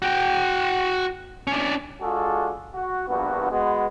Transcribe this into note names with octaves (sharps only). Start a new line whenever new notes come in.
F#4 G5
C#4 D4
G#3 D4 F4 F#4 G#4 A4
F#4
A#1 E2 G2 B3 F#4
G#3 B3 F#4